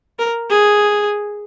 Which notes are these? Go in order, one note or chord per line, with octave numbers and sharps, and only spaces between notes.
A#4
G#4